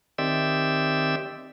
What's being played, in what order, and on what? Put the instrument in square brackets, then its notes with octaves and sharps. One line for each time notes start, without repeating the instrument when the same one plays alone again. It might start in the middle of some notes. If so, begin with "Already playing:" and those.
[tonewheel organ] D#3 C4 G4 D5 E5 E6